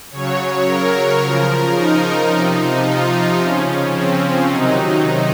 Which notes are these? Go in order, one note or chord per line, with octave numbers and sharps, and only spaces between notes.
C#3 F#3 C#5
A#4
C#3 F3
D#4
C3 F3
F4
C#3 F3 C#4
C4
C3 D#3 F#3 D#4